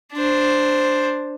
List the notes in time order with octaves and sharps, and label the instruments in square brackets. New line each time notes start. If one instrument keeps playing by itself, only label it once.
[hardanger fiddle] D4 C5